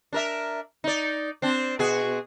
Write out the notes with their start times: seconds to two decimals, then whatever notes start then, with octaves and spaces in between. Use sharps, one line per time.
0.13 D4 A#4 E5
0.84 D#4 D5
1.42 C4 D4
1.79 B2 F#4 G#4